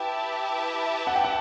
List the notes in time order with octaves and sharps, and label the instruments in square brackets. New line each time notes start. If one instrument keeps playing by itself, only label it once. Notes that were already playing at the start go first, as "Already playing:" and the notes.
Already playing: [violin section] E4 G4 B4 E5 A5 [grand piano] G5
[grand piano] F#5
G5
F#5